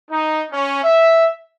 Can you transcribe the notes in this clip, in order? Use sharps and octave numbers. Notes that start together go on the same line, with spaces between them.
D#4
C#4
E5